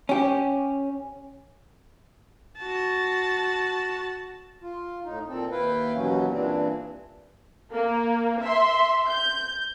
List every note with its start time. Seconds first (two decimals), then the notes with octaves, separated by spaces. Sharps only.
0.09 C#4 G4
2.59 F#4 A5
4.63 F4
5.04 A2 D#4
5.28 A#2 C4 A4
5.51 D#2 E4 B4 F5 G5
5.95 D#2 B2 E3 F#3 C#4
6.31 G2 A#2 E3 C4 D4
7.73 A#3
8.42 E5 C6
9.08 G6